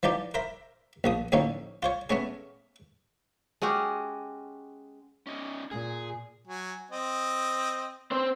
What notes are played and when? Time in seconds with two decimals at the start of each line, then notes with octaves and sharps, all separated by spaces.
0.03 E3 F3 D#4 G4 D5
0.34 A#4 C5 E5 B5
1.04 A#1 F3 D#6
1.32 D#2 A2 D3 F3 C#4 D#4
1.83 F4 C5 C#5
2.10 A3 B3 C#4 G#4
3.62 G#3 C#4 F#4 G4
5.27 C#4 D#4
5.71 A#2 G#4
6.47 F#3 G#5
6.91 C4 D#5
8.11 C4 C5